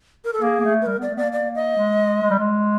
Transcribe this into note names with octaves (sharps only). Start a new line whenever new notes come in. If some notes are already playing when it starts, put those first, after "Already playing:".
A#4
A4
A#3 G#4
A#3
A3
B4
G3 A#4
B3 D5
A3
A#3 B3 D5
D5
D#5
G#3
G#3
G3
G#3